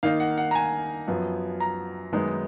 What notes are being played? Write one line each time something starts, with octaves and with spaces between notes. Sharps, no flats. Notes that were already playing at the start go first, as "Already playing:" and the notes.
D#3 A#3 D#4 F5
F#5
F#5
A#5
G#5
F#2 F3 B3
A#5
F#2 D#3 G#3 B3 D#4